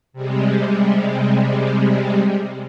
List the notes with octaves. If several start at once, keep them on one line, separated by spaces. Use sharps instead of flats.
C3 G3 G#3